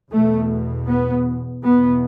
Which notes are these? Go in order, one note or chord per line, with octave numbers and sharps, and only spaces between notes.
E2 B2 A3
B3
E2 B2 B3